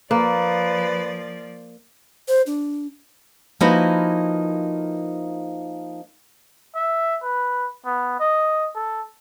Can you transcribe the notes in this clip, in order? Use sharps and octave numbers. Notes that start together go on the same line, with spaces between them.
F3 A#3 B4 D5
C5
D4
F3 A#3 D#4 E4 F#4 B4
E5
B4
B3
D#5
A4